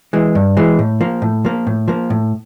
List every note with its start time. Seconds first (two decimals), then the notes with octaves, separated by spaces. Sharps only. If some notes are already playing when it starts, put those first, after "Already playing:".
0.13 E3 G#3
0.35 G2
0.57 E3 G#3
0.79 A2
1.01 F3 A#3
1.22 A2
1.45 F3 A#3
1.67 A2
1.88 F3 A#3
2.10 A2